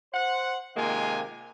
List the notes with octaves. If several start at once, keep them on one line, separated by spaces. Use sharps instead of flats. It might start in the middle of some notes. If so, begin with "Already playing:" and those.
C5 F#5
C3 D#3 G#3 A#3 F4 G#5